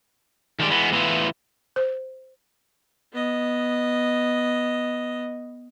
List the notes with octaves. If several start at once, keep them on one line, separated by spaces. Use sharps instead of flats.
D#3 G3 G#3 D5
E3 G#3 B3
A2 E3 F#3 B3 E4 F4
C5
B3 D#5